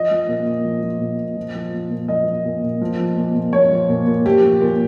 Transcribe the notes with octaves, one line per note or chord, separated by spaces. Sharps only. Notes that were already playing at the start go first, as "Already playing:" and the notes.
Already playing: F3 D#5
F3
A#2
A#2
F3
F3
A#2
A#2
F3
F3
A#2
A#2
F3 D#5
F3
A#2
A#2
F3
F3
A#2
A#2
F3 C#5
F3
A#2
A#2
F3 G4
F3
A#2